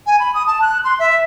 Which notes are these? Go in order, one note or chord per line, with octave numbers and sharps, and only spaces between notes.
G#5
B5
D#6
A5
F#6
C6
E5